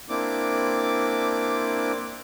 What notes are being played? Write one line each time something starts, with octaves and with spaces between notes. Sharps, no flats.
A#3 C4 D4 E4 D6